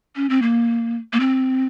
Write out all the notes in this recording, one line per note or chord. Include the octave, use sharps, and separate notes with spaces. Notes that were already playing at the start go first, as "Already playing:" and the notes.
C#4
C4
A#3
A#3
C4